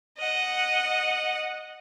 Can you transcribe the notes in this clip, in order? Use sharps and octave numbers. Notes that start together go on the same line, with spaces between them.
D#5 F#5